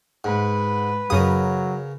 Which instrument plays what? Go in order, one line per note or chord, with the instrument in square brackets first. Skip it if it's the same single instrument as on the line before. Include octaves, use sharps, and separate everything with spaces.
[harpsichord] G#2 [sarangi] B4
[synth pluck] F#2 D#6 [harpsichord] C#3 C#4 A#4 [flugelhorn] F#3